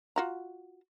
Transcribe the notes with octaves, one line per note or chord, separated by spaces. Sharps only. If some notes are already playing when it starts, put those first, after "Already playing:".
F4 F#4 A#5